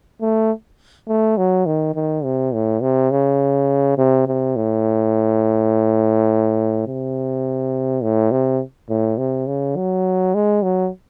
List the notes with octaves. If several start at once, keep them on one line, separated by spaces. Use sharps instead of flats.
A3
A3
F#3
D#3
D#3
C3
A2
C3
C#3
C3
C3
A2
C3
A2
C3
A2
C3
C#3
F#3
G#3
F#3